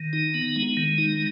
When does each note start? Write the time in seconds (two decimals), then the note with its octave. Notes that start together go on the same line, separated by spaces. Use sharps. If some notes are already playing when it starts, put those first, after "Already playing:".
Already playing: D#3
0.13 D#4
0.34 B3
0.56 G#3
0.77 D#3
0.98 D#4